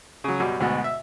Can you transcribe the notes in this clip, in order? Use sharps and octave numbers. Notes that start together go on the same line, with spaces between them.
C#3 F#3
F#2 B2 G3
D2 G#2 B2
E5